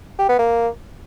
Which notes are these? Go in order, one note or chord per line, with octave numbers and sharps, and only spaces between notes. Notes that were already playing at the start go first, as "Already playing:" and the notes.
G4
B3
A#3